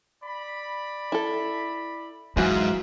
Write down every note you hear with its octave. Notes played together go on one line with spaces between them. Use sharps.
D5 B5
E4 A4
G#2 E3 F#3 F#4 G#4 E5 F5